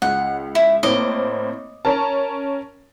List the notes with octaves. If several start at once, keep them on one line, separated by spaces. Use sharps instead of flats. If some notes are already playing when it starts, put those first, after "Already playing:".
C#2 F#5
E4
A2 A#3 C4 D#5 D6
C#4 A#4 A5